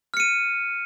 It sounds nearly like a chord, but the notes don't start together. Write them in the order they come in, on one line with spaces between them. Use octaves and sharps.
F6 C#7 D#7